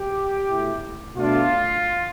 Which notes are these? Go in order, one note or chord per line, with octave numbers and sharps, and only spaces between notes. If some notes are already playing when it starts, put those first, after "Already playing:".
Already playing: G4
B2 A3 E4
B2 A3 D4 F4